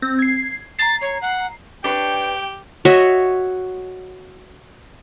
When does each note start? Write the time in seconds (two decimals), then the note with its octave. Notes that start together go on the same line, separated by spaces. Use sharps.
0.02 C4
0.19 G#6 C7
0.79 A#5 A6 C7
1.01 C#5
1.21 F#5
1.84 D4 G4 B4 C#5 G5
2.85 F#4 C#5 D#5 E5